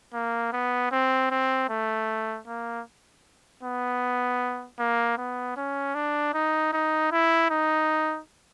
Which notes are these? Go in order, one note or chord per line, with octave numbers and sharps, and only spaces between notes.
A#3
B3
C4
C4
A3
A#3
B3
A#3
B3
C#4
D4
D#4
D#4
E4
D#4